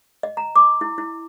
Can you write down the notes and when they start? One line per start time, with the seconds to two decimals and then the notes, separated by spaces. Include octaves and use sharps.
0.23 D#5
0.37 A#5
0.56 D6
0.81 E4
0.98 E4